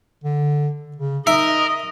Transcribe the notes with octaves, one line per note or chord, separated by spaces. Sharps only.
D3
C#3
D#4 A#4 D#5 E5